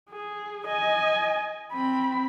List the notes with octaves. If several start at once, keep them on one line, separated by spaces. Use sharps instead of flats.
G#4
D#5 G#5
C4 B5